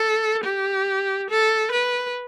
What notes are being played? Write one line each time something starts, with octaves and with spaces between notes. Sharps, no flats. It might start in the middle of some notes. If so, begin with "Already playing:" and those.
Already playing: A4
G4
A4
B4